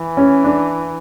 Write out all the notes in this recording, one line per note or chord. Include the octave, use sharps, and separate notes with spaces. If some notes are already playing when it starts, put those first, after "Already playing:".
Already playing: E3
C#4
D4